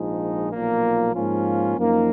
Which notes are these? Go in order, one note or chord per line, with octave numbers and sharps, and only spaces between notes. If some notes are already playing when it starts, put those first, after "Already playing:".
Already playing: A#1 G#2 F3 G#3 D#4
B1 A#2 F3 A#3
G#2 F3 A#3 C#4 F4
F#2 F3 A#3 D#4